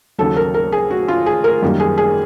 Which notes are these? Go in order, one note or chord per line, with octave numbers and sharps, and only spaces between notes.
D#2 C#3 F#3 A4
A#4
A#4
G#4
F#4
F4
G#4
A#4
F#2 D#3 G3 A#3
G#4
G#4